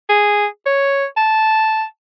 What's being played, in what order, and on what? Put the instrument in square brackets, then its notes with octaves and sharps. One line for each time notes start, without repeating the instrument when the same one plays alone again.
[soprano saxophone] G#4
C#5
A5